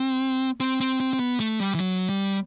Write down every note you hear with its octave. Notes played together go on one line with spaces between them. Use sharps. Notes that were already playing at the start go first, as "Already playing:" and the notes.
Already playing: C4
C4
C4
C4
C4
B3
A3
G3
E3
F#3
G3